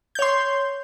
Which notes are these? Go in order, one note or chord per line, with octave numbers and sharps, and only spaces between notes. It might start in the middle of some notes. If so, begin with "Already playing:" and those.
C#5 C6 G6